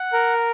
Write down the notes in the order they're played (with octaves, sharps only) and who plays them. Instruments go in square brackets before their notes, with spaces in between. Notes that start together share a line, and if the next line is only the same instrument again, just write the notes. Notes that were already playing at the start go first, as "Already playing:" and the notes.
Already playing: [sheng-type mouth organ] F#5
A#4